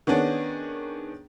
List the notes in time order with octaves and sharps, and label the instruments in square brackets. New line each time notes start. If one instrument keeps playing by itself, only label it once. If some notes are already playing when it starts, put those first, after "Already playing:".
[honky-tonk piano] D#3 B3 C#4 D4 G#4